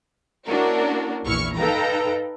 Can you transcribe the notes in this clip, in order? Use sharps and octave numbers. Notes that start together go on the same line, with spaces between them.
A#3 C#4 D4 E4 F#4 A#4
A#1 E2 E4 C#6 F6
D#4 A4 B4 F5 G5 A#5